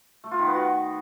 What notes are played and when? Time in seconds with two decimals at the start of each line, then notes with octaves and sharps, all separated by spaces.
0.24 A3
0.31 F4
0.39 D#3
0.46 B3
0.54 F#4